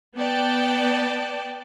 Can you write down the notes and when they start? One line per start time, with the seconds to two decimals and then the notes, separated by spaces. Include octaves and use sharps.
0.17 B3 D5 G5 A5